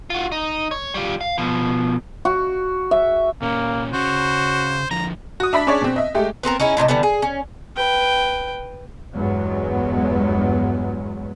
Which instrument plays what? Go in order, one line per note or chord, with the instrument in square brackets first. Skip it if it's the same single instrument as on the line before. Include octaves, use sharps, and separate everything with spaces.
[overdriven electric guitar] F4 F#4
D#4
C#5
G3 F4
F5
B2 F3
[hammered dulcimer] F#4
E5
[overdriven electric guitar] A#2 C#4 [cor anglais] A#3
[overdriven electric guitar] C#3 C#4 [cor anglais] F#4 [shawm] C5
[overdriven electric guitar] D3 F3 [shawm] A#5
[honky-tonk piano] F#4 D#6
D4 E5 B5 B6
C#4 D4 G#4 C#5 D5
B2 C4
D#5 E5
G#3 A3 G4
[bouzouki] B3 C4 A4 A#4
C#4 D#4 E4 G#4
A2 C3 F4 D#5
D3 E3 G3 B3
G#4
C#4
[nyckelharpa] B4 G5
[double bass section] E2 G2 F#3 G#3 B3